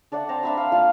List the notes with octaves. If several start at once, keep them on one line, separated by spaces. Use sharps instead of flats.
D4 D5 E5 F#5
C4 A5 A#5 C6
D4 E5 B5
F5
A#3 F4 F5 D#6